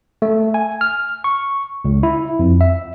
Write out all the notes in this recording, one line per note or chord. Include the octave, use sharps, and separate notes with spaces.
A3
G#5
F6
C#6
C#2
E4
F2
E5